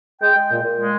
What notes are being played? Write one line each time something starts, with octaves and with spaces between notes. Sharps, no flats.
G#3 G5
G#3
A#2
A#2
G#3